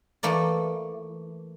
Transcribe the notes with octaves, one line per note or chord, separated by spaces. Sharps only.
E3 A3 A#3 D5